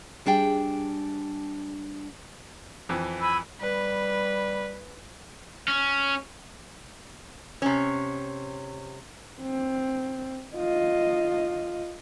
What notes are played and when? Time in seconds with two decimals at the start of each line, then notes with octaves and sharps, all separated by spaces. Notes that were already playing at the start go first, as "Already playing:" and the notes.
0.26 G3 D4 G#4 G5
2.89 F2 E3
3.21 G#5 B5 E6
3.61 G3 B4
5.68 C#4
7.62 C3 C#4
9.41 C4
10.56 F4 D#5